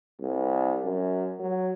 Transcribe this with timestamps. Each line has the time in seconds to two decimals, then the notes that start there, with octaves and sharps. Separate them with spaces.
0.20 C2
0.84 F#2
1.39 F#3